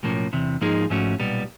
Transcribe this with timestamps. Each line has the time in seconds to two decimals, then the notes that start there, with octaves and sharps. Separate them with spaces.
0.03 B1 A2 F3 A#3 C#4
0.33 E2 C3 E3
0.61 G#2 F3 A#3 D#4 G#4
0.90 G#2 F3 A3 C#4 F#4
1.20 B1 A#2 G3 B3